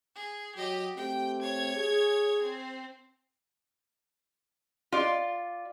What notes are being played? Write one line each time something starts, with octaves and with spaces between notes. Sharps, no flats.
G#4
F#3 G4 D#5
A3 C4 G4 G5
C#5 G#6
G#4
C4
F4 D5